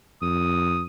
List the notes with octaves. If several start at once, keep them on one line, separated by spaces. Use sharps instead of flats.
F2 D#6